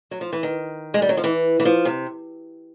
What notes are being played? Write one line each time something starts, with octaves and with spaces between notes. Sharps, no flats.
F#3
F3
E3
D#3
G#3
G3
F#3
F3
E3
E3
F3
C3